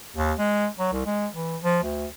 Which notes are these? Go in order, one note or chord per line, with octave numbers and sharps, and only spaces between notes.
D#2
G#3
F#3
C2
G#3
E3
F3
D2